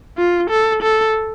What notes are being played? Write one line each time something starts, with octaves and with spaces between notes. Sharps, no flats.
F4
A4
A4